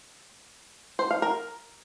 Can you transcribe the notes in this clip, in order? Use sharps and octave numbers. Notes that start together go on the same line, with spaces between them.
C5
F5
A#4